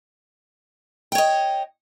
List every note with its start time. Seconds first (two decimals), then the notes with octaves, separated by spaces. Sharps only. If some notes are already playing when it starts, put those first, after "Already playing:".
1.12 G5
1.15 C#5
1.18 D#5